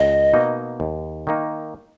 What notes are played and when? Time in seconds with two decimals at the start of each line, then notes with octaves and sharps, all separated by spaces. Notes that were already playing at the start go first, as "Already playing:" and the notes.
Already playing: C#2 D#5
0.33 B2 A#3 D#4
0.80 D#2
1.27 D#3 A#3 D#4